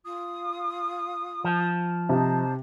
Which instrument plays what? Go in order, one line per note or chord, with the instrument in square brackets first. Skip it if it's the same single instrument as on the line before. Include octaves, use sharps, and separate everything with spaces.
[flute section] F4 D#6
[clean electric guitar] F3
[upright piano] C3 [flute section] D#4 C5 A5